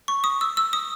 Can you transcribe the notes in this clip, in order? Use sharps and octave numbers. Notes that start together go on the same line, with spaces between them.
C#6
D#6
E6
E6
D#6